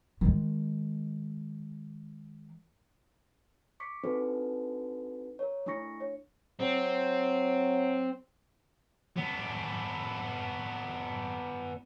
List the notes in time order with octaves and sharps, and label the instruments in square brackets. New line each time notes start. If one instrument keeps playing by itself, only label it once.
[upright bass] D#3 G#3
[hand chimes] C#6 D6 B6 C#7
C4 D4 D#4 F#4 A4 B4
A#4 C#5
A3 D4 E4 C#6 A#6 C#7
C#5
[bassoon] F#3 [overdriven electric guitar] C4
[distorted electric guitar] B3 D4